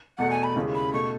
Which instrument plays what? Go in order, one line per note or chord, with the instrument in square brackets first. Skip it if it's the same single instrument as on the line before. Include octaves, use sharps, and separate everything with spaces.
[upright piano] E2 B2 A3 [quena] F#5
[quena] G#5
B5
[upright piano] D#2 C#3 G#3 C#4 E4
[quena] B5
[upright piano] B2 A3 [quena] C#6